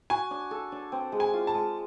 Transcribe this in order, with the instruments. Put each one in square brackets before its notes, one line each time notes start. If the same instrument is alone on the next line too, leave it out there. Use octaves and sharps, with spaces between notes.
[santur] F#4 [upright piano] G#5
[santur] D4
A4
D4
C4
G#3
[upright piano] G#5
[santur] F4
[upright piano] A5
[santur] G#3